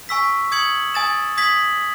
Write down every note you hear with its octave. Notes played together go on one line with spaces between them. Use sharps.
G#5 C#6 E6 B6
D#6 G#6 C#7 F#7
G#5 D#6 A6 E7
D#6 G#6 B6 F#7